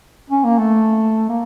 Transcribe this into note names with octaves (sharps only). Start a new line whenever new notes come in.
C#4
A#3
A3
A#3